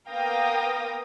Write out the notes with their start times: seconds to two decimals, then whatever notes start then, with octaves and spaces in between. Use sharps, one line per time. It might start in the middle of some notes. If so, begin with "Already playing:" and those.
0.10 A#3 B3 F5 G5 D#6 A#6